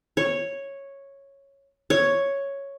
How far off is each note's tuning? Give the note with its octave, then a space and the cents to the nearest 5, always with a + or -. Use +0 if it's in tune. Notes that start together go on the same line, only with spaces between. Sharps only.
C#5 -5
C#5 +0